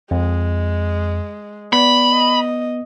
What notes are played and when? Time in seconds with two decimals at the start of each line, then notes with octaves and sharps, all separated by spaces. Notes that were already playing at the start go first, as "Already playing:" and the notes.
0.11 F2 G#3
1.73 B3 D5 B5
2.13 D#5